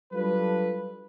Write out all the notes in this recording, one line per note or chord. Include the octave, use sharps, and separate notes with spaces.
F#3 G3 D4 F4 A4 B4